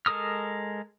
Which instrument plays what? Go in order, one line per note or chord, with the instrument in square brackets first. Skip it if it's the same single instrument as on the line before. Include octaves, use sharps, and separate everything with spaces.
[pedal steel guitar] G#3 A4 A#4 D#6 F6